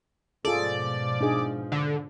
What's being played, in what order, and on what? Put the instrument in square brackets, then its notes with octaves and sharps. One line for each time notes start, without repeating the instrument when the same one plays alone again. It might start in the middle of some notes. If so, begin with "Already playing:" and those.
[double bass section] G#2 B2 F3 [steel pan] F4 G#4 A4 [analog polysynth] D5
[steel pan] D4 D#4 G#4
[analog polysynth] D3